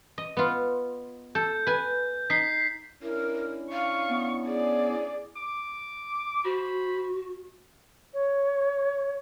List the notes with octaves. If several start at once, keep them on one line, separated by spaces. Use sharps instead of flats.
D#5
B3 F4
A4 G6
B4 G#5
D#4 B6 C7
C#4 D4 E4 A#4
F5 C#6
B3
G#4 D5
D6
F#4 C5 B5
C#5